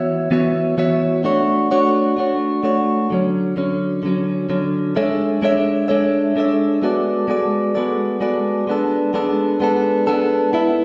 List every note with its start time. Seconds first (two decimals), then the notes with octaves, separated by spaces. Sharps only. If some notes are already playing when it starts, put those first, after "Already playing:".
Already playing: E3 B3 F#4 C#5 E5
0.31 E3 B3 F#4 C#5 E5
0.78 E3 B3 F#4 C#5 E5
1.24 A3 D4 F#4 C#5
1.71 A3 D4 F#4 C#5
2.17 A3 D4 F#4 C#5
2.63 A3 D4 F#4 C#5
3.10 D3 F#3 C#4
3.57 D3 F#3 C#4
4.03 D3 F#3 C#4
4.49 D3 F#3 C#4
4.96 G#3 D4 A4 C#5 E5
5.42 G#3 D4 A4 C#5 E5
5.88 G#3 D4 A4 C#5 E5
6.36 G#3 D4 A4 C#5 E5
6.82 G#3 B3 F#4 A4 D5
7.28 G#3 B3 F#4 A4 D5
7.75 G#3 B3 F#4 A4 D5
8.21 G#3 B3 F#4 A4 D5
8.67 G#3 B3 D4 A4
9.14 G#3 B3 D4 A4
9.60 G#3 B3 D4 A4
10.07 G#3 B3 D4 A4
10.53 B3 E4 A4 E5